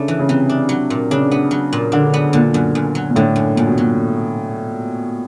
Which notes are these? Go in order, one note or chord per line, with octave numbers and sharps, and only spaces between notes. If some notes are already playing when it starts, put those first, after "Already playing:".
Already playing: C#3 A3 D4
E3
C#3
C3 E3
D4
F#3
A#2
C#3 D4
B3
F#3
A#2
D3 D4
B3
A#2 D3
F#2
F#2
F#3
A#2
A2 D3
F#2
F#2 A#2
B2
A#2 F#3